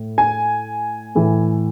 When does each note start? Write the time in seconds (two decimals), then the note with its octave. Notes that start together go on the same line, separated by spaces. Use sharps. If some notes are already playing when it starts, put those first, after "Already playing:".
Already playing: A2
0.18 G#5
1.15 A2 E3